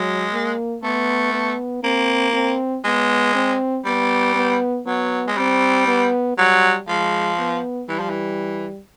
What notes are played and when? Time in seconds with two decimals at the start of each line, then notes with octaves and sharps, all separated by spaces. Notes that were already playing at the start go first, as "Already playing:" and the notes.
Already playing: F#3 G#3
0.32 A#3
0.83 A3 B3
1.33 B3
1.83 A#3 C4
2.34 C4
2.84 G#3 B3
3.35 C4
3.85 G3 B3
4.36 B3
4.86 F#3 B3
5.27 G#3
5.37 G3 C4
5.87 B3
6.38 F#3 G3
6.88 F3 G#3
7.39 B3
7.89 E3 G3
7.99 F3
8.10 E3